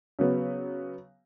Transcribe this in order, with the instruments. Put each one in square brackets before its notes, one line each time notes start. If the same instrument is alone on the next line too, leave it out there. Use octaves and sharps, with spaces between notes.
[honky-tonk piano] C#3 F#3 B3